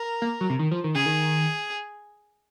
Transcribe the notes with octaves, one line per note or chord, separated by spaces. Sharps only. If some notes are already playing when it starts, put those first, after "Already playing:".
Already playing: A#4
A#3
F#3
C3
D#3
F3
D#3
C#3 G#4
D#3